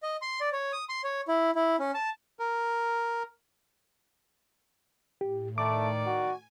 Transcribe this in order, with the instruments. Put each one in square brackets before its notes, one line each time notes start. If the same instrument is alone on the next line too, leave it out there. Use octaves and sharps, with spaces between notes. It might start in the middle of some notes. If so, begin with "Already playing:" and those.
[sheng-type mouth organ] D#5
C6
D5
C#5
D#6
C6
C#5
E4
E4
C#4
A5
[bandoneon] A#4
[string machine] A2 [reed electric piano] G4
[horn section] D#3 D5 [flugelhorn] A3 [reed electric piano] D6
[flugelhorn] F#4 [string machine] G#5